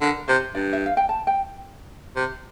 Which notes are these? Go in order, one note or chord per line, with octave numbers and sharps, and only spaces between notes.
D3 A#4
C3 C5
G2 D5
E5
F5
G5
A5
G5
C3